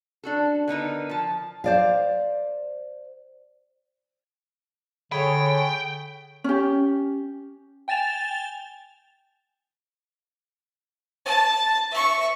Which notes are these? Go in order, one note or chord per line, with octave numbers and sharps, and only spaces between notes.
D4 F#4 A4
D3 B3 D#4 A#4
F3 A5
C5 D5 F5
D3 G#4 C#5 G5 B5
C#4 G4
G5 G#5 A6 E7 F7
A5
E5 C#6